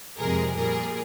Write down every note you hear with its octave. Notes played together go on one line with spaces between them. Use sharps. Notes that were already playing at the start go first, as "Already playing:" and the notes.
F2 C3 F3 G#3 G#4 A#4
A#2 G3 G#4 A#4